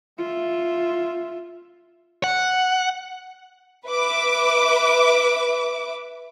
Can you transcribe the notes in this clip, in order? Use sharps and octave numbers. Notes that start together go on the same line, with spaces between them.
F4 E5
F#5
B4 E5 D6